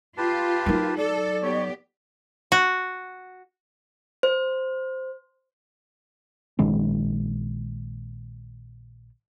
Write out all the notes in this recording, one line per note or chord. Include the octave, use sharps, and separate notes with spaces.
F4 G4 B4 A5
F#3 D#4 A#4
A4 D5
B3 G4 C#5
F#4
C5
A#1 D#3 G#3 C#4